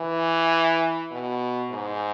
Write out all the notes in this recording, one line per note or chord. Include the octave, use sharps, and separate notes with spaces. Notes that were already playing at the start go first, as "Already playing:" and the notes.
Already playing: E3
B2
G#2